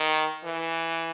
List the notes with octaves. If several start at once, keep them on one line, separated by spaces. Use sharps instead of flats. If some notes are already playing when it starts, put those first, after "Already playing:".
Already playing: D#3
E3